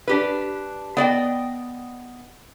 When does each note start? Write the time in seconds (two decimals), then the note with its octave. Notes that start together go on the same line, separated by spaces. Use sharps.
0.08 D4 G4 B4
0.97 B3 D5 D#5 G5